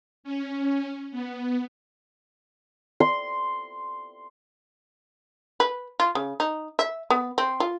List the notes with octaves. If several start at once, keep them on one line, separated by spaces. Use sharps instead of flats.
C#4
B3
C6
B4
F4
C#3
D#4
E5
B3
C4
F4